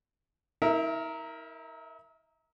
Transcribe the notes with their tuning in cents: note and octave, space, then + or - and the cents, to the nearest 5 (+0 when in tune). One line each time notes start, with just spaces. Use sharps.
E4 -45 A#4 +0 E5 +15